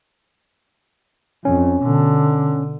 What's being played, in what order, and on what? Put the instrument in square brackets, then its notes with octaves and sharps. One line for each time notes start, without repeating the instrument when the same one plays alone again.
[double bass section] F2 [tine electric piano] C#4
[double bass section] B2 [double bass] D3